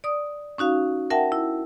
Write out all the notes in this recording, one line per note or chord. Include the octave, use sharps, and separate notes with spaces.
D5 D#6
C#4 D#4 F#4 F5
A#4 E5 F#5 G5 A5
E4